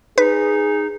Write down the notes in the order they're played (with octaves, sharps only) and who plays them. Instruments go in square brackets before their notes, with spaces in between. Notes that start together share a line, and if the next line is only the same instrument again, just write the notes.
[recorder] D#4 [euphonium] G#4 [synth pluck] B4